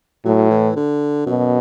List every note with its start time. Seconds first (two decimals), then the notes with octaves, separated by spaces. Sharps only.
0.25 A2 F#3
0.51 E3
0.76 D3
1.27 F#2 B2